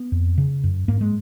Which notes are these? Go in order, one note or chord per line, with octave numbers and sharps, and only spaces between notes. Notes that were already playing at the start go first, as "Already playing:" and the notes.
Already playing: B3
F2
C#3
F#2
G#2 A#3
G#3